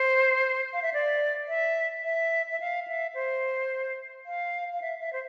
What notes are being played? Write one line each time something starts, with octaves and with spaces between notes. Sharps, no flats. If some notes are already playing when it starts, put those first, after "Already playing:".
Already playing: C5
F5
E5
D5
E5
E5
E5
F5
E5
C5
F5
F5
E5
E5
C5